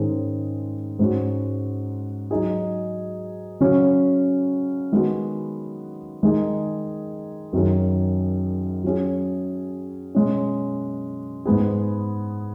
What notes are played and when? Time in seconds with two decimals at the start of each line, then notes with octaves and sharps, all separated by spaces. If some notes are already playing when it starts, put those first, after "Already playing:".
Already playing: G#2 D#3 G#3 C#4 G#4
0.99 G#2 G#3 C#4 F#4
2.31 F#3 D#4 G#4
3.61 C#3 F#3 C#4 F#4
4.92 D#3 G#3 B3 F#4
6.23 D#3 G#3 D#4 G#4
7.53 F#2 D#3 F#3 C#4 G#4
8.84 F#3 C#4 G#4
10.15 B2 G#3 C#4
11.45 G#2 G#3 B3 G#4